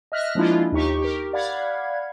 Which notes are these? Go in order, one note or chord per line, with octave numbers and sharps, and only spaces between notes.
D#5 E5 F6 F#6 A#6
F3 G#3 A#3 D4 E4 F4
D#2 D#4 G4 C#6
G4 A#4
D5 F5 F#5 B5 G#6